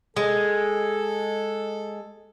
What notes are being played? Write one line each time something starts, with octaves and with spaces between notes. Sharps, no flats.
G#3 A4